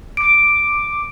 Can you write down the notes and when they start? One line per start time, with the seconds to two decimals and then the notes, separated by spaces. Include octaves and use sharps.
0.17 D6 D7